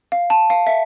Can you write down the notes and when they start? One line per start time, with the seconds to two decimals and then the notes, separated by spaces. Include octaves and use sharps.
0.12 F5
0.30 A5
0.50 F5
0.67 E5